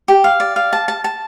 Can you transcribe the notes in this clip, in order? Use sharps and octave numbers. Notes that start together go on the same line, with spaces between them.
G4
F5
D5
F5
A5
A5
A5